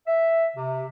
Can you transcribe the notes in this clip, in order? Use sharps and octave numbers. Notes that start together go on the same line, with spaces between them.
E5
C3